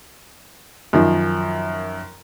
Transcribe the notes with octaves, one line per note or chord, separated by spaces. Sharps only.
F#2 D#3 F3